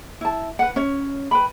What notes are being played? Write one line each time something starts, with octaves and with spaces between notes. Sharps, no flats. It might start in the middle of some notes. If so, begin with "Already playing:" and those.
E4 A5
B4 F#5
C#4 C#5
B4 G5 B5